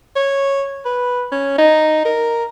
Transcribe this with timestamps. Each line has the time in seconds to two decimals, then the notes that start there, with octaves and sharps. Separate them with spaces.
0.16 C#5
0.86 B4
1.32 C#4
1.58 D#4
2.05 A#4